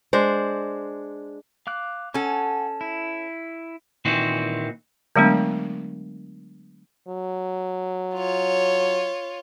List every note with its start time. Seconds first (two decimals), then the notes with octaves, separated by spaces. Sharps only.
0.13 G#3 D4 C5
1.67 F5 D6 F#6
2.14 C#4 A4 F#5 G#5 C#6
2.81 E4
4.05 A#2 D#3 E3 C4 F#4
5.16 D3 F#3 G#3 A3 B3 D4
7.08 F#3
8.15 F4 C#5